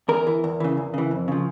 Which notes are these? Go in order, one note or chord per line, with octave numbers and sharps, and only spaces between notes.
E2 A#4
E3
E2
C#3 E3
E2
C#3 E3
F2
C#3 F3